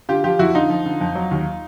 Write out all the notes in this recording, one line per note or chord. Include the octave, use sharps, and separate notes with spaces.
D3 F4 G4
F3 F4 G4
F2 E4 F#4
D3 D#4 F4
F3
D3
F2
F#3
D#2